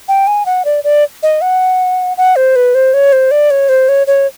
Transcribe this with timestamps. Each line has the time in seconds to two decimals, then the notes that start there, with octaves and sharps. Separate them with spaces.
0.08 G5
0.27 G#5
0.46 F#5
0.65 D5
0.84 D5
1.23 D#5
1.41 F#5
2.17 F#5
2.36 C5
2.56 B4
2.75 C5
2.94 C#5
3.13 C5
3.31 D5
3.51 C#5
3.69 C5
3.89 C#5
4.07 C#5